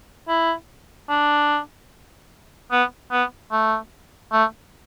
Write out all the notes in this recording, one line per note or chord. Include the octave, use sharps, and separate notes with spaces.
E4
D4
B3
B3
A3
A3